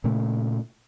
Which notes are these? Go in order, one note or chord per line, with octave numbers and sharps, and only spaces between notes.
A#2 C#3 A3